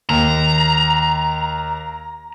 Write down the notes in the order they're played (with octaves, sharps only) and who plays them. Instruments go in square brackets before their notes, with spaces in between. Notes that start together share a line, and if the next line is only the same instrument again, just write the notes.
[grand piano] D#2 [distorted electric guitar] A#5